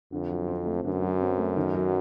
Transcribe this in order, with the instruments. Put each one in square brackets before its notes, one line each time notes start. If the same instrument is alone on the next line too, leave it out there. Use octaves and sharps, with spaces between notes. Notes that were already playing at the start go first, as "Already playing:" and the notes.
[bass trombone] F2 [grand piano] D3
[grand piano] F#3
C4
A3
[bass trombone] F#2 [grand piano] D3
[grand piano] F#3
C4
A3
D#3
F#3